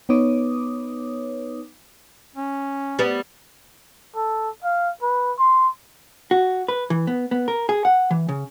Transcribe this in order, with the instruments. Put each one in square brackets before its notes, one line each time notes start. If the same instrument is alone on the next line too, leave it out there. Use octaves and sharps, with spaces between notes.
[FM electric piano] B3 D#4 B4 C#5 D6 D#6
[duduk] C#4
[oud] G3 B3
[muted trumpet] A4
F5
B4
C6
[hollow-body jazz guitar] F#4
B4
E3
B3
B3
A#4
G#4
F#5
E3
C#3